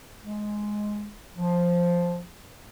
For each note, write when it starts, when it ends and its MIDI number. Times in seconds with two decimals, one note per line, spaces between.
0.23 1.13 56
1.36 2.21 53